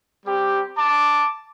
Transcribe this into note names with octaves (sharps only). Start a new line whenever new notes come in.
G3 C4 G4
A5 D6